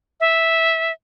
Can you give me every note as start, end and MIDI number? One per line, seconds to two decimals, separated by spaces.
0.20 0.92 76